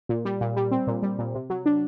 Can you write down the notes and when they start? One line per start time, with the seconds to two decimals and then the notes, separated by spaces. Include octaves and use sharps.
0.09 A#2
0.25 G3
0.41 A#2
0.56 G3
0.71 C4
0.87 A#2
1.03 G3
1.19 A#2
1.34 C3
1.50 F#3
1.66 D4